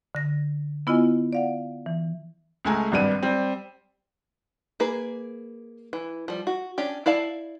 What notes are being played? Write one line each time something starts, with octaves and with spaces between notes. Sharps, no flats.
D3 A#6
B3 E4 F4 D#5 G#5
D5 F5 F#5
E3
C#2 G#3 A3 G#5 A#5
G#1 G2 G3 B4 D#7
G3 C4
A#3 G#4 B4
E3
F3 G3
F#4
C#4 D4 G4
E4 D5 F5 A5